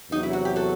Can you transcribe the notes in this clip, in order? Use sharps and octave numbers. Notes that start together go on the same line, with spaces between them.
E2 C3 F#3 D#4
E4
F#4
G4
F#4 A4